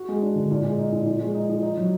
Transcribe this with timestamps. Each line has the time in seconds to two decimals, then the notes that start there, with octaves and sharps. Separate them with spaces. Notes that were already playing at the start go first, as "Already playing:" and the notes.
Already playing: F#4
0.08 G#3
0.22 D4
0.35 D3
0.51 A#2
0.64 G#3
0.79 D#4
0.92 A#2
1.06 F3
1.21 G#3
1.35 D#4
1.49 F3
1.62 D#4
1.77 F#3